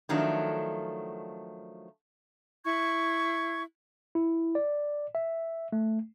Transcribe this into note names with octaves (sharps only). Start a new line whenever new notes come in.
D#3 F3 F#3 A3 D4
E4 C#6 G#6
E4
D5
E5
A3